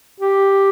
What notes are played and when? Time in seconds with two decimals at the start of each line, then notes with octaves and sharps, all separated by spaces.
0.20 G4